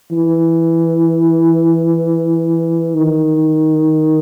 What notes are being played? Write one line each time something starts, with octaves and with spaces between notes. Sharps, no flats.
E3
D#3